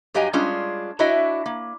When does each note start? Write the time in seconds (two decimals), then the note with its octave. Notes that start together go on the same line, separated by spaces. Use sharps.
0.14 G2 F#3 G4 D#5 F5 G#5
0.33 G3 G#3 C#4 D4 F4 G#4
0.99 D4 E4 F#4 C#5 D#5 E5
1.46 A#3